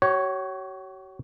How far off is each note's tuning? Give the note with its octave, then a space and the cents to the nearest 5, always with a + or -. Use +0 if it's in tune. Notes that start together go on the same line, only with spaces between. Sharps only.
F#4 +45 C#5 +0